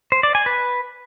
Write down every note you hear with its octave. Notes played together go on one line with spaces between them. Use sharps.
C5
D5
G#5
B4